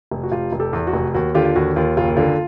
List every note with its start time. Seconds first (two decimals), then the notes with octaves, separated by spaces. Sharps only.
0.11 F1
0.23 F#4
0.32 F1 F4 G4
0.52 F1
0.59 G4 A4
0.73 E2
0.87 F#4
0.93 F1
1.14 D#2 F#4
1.35 D3 F4 G4
1.45 F4
1.56 D#2 F#4
1.76 D#2 F4
1.97 F#1 F4
2.17 D3 F4